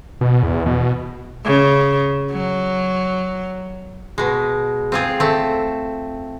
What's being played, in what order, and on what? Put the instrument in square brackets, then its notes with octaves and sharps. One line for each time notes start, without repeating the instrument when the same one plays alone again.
[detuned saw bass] B2
E2
B2
[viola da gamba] C#3
F#3
[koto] B2 G#3
C4 F4 G#4
A3 C4